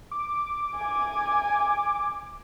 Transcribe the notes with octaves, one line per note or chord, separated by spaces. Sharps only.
D6
G#5